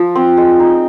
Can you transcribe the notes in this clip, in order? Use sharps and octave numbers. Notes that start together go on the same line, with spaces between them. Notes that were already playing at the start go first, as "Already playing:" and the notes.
Already playing: F3
C4
G#3
D#4